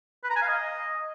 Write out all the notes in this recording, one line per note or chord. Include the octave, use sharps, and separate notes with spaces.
B4
A#5
G#5
F5
D#5